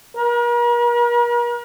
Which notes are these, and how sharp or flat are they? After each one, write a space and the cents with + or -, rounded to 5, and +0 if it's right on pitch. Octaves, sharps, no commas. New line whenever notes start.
A#4 +45